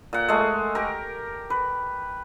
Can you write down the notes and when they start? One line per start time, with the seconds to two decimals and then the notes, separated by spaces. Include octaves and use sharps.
0.13 A#2 F#5
0.28 G#3 A3
0.75 G4 A#4
1.50 B4